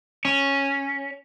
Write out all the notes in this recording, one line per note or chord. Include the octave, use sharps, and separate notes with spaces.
C#4